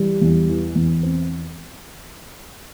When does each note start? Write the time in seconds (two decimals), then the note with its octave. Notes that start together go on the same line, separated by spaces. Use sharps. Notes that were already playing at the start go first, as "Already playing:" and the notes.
Already playing: E3 G3
0.21 E2
0.49 E3
0.76 E2
1.03 C4